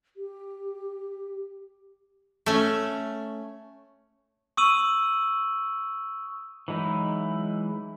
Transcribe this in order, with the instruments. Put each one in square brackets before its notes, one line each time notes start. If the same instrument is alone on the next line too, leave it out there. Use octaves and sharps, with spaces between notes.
[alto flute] G4
[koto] A3 C#4
[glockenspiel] C#6 D#6 E6 D#7 F#7
[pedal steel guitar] E3 F#3 G#3 D#4 E4